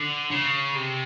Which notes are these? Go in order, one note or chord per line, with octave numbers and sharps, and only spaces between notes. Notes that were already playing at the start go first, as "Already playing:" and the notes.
Already playing: D3
C#3
C3